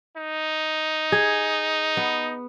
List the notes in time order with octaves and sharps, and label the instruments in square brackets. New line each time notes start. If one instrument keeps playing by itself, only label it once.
[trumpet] D#4
[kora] G#4
B3